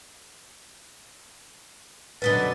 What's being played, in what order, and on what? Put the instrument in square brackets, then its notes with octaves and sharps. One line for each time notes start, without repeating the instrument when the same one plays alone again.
[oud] F#2 B2 D3 [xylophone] B4 B6 G7 [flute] A6